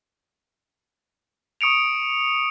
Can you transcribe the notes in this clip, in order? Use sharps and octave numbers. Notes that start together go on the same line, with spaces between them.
C#6 D#6 C#7 D7 F7